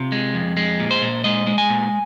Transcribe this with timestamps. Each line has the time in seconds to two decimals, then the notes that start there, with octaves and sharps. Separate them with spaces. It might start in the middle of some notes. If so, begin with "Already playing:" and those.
Already playing: C3 F4
0.12 G#3
0.34 F2
0.57 G#3
0.80 A#2
0.91 C5
1.02 A#2
1.24 G#3 D#5
1.47 G#3
1.58 G#5
1.70 A#2